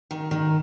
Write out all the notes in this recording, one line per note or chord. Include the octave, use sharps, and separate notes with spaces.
D#3
D#3